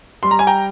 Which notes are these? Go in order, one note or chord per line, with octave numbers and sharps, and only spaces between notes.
G3 C6
A#5
G#5
G5 A#5